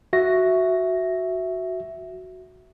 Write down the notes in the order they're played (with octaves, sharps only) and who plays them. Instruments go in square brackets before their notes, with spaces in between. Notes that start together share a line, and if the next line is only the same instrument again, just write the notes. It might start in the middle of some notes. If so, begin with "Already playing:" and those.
[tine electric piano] F#4 E5 A#6